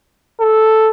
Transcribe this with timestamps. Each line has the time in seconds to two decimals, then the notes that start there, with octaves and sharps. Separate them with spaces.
0.41 A4